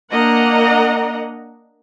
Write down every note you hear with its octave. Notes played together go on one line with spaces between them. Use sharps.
A#3 D4 D#5 F#5 A#5